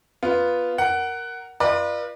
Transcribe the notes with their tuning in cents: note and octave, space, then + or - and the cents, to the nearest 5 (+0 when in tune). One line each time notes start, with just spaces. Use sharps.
B3 +0 F4 +0
A#4 +0 F#5 +15
F4 -25 B4 -35 D5 +35